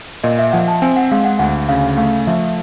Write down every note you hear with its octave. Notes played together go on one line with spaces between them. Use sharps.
A#2 D#5
E5
F3 F#5
A5
C4 G#5
F#5
G#3 F5
F#5
D2 F#5
C#3 F5
A3 F5
F3 E5